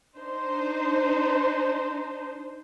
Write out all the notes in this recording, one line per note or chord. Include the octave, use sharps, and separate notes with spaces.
D4 D#4 C5